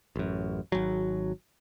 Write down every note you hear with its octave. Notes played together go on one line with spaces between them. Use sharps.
A1 F#2
G#1 F#3